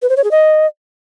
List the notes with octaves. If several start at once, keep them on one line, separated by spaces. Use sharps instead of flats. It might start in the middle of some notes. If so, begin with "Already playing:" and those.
B4
C5
C#5
G#4
D#5